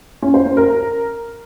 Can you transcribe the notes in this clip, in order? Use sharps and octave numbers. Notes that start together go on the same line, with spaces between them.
C#4
C5
C#4
A#4